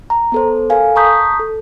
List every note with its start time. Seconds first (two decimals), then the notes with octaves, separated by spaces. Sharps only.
0.10 A#5
0.32 B3 A4 C5
0.70 A4 A#4 F5 G#5
0.96 A5 A#5 C#6 D#6 G6 B6
1.39 A4